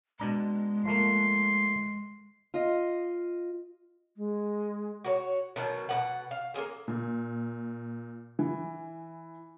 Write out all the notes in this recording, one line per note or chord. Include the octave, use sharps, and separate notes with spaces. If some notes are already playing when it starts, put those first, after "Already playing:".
B2 G#3 D4 A#5
F3 A3 A#3 C6
F4 D#5
G#3
F#4 A#4 C#5
B2 D#3 F#3
B2 A#3 F#5
F5
A#3 C#4 G#4 A4
A#2
E3